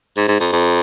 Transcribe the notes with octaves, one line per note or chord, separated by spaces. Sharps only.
G#2
G#2
F2
F2